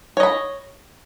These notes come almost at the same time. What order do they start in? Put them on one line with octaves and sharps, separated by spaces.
C#5 D#5 B5